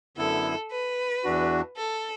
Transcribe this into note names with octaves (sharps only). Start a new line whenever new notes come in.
F#2 D3 B3 E4 A4
B4
E2 E3 D4 F#4
A4